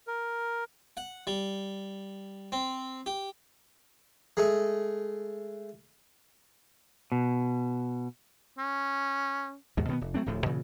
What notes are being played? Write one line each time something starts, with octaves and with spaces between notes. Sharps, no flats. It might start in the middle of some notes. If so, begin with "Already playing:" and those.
A#4
F#5
G3
C4
G4
G#3 A3
B2
C#4
D#2 G#2 B2
B2 D#3 F#3 B3
F1
F#3 A3 C4 D4
D1 D2 A2 F3
G2 A#2 C#3 E3